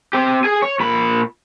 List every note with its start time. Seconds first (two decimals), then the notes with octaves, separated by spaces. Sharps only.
0.13 C4 G4
0.44 G#4 G#5
0.62 C#5
0.80 A#2 B5